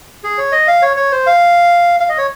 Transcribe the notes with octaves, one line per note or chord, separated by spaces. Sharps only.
G#4
C#5
D#5
F5
C#5
C#5
C5
F5
F5
D#5
C#5